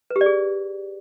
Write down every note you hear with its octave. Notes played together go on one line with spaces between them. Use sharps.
B4
G4
D5
G#4